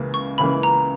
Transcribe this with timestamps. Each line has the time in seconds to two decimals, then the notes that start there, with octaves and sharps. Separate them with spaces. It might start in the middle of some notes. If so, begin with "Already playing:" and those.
Already playing: C#2 C#3 E3 A#3
0.14 C#6
0.38 C#2 C#3 E3 A#3 B5
0.63 A#5